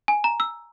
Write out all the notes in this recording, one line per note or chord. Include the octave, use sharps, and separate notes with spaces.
G#5
A#5
E6